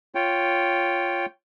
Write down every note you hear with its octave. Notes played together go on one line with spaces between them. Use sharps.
F4 C#5 G5